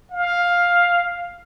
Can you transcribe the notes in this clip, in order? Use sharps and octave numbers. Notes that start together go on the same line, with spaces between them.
F5